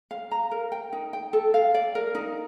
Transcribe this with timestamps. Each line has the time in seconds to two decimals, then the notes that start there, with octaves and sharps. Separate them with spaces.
0.11 F5
0.31 A#5
0.51 A#4
0.72 G5
0.93 D#4
1.13 G5
1.33 A4
1.54 F5
1.74 D5
1.95 A#4
2.15 D#4